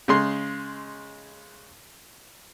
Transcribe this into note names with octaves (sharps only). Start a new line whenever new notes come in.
C#3 G#3 C6